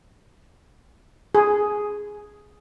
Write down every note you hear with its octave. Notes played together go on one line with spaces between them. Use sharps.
G#4